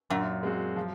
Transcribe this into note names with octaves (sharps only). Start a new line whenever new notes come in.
F#2 A#2
G#3 C4 F#4
F3